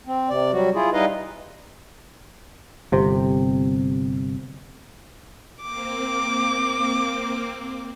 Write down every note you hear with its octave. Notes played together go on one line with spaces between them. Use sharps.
C4
C3 D5
F#3 G3 F#4
E4 F4 G#4
G3 D#4 E4 B4 D#5 F5
G1 C3 C4
A#3 C4 D6